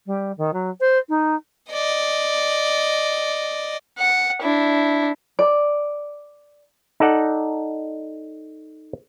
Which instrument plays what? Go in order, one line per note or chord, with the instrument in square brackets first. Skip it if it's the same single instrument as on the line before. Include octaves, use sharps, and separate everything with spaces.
[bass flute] G3
D#3
F#3
C5
D#4
[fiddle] D5 D#5
F#5
D4 E4
[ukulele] D5
[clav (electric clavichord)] D#4 A4 D5 F#5